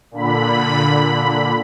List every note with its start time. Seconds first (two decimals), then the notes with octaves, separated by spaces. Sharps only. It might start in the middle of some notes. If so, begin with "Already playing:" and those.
0.11 A#2 D3 B5